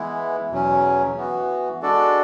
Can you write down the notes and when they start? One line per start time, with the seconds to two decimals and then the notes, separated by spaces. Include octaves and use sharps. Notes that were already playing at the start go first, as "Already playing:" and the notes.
Already playing: E3 G#3 B3 E4
0.50 E2 B2 F#3 C#4
1.16 E3 B3 F#4
1.82 G#3 D4 F#4 A4 D5